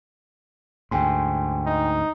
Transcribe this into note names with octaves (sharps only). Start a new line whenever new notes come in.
D2 G#2 G5 G#5 C6
D#4